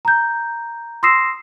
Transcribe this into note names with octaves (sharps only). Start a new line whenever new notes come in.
A#5 G6
C6 D#6 E6 A#6 C7 E7